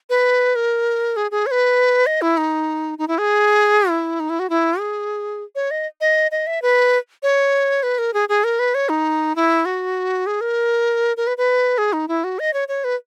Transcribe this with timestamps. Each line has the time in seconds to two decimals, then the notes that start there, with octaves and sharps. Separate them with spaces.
0.10 B4
0.56 A#4
1.16 G#4
1.31 G#4
1.46 C#5
1.51 B4
2.06 D#5
2.22 E4
2.37 D#4
2.98 D#4
3.08 E4
3.18 G#4
3.90 E4
4.20 D#4
4.30 E4
4.39 F#4
4.50 E4
4.79 G#4
5.55 C#5
5.71 D#5
6.01 D#5
6.31 D#5
6.47 E5
6.62 B4
7.23 C#5
7.83 B4
7.98 A#4
8.14 G#4
8.29 G#4
8.44 A#4
8.59 B4
8.75 C#5
8.89 D#4
9.36 E4
9.65 F#4
10.27 G#4
10.41 A#4
11.17 A#4
11.27 B4
11.38 B4
11.78 G#4
11.93 D#4
12.08 E4
12.24 F#4
12.39 D#5
12.53 C#5
12.68 C#5
12.84 B4